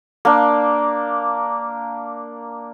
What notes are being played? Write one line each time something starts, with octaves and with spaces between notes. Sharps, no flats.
A#3 D4